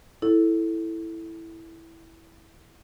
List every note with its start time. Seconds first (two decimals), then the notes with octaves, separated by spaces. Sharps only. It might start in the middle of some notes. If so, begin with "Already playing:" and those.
0.22 E4 A4